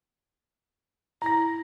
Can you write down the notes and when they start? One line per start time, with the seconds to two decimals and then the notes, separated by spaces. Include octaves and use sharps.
1.22 E4 A#5 A#6